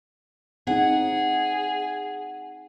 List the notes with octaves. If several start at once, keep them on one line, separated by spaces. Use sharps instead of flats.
C4 D#4 G#4 F#5